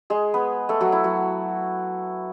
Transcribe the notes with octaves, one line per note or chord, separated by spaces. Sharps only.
G#3 G#4
B3 B4
A3 A4
F#3 F#4
E4
F#3 F#4